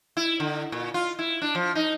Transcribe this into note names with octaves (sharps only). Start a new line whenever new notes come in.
E4
D3
A#2
F4
E4
D4
F3
D#4